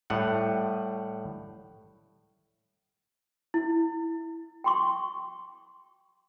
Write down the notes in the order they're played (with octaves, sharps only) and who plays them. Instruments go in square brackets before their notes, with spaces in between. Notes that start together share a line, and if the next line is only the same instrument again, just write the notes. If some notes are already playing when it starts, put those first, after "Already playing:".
[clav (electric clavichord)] A2 G3 F#5
[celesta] E4
[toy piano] G5 C6 C#6